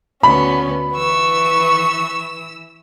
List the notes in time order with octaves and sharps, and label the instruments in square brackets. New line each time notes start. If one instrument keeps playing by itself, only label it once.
[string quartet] D2 B3 [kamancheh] C#4 [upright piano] B5
[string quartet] E3 E6 [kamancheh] B4 C#6